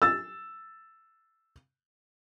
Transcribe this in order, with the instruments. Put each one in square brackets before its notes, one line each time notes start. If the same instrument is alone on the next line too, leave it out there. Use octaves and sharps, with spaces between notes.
[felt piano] E6 A6